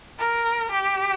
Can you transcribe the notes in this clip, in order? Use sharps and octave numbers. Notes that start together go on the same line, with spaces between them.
A#4
G4